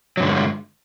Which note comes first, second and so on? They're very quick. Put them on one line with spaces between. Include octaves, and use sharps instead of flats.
F#3 G2 D3 G#3